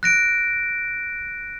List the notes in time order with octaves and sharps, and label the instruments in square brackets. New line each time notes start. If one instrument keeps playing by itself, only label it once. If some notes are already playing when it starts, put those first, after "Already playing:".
[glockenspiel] F#6 A#6 D7